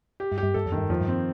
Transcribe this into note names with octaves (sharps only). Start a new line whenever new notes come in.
G4
G2
G4
G2
G2 A4
F2
D#3
G2
F2 F3
G2
C4